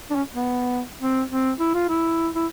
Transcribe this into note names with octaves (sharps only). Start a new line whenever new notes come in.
D4
C#4
B3
C4
C4
E4
F4
E4
E4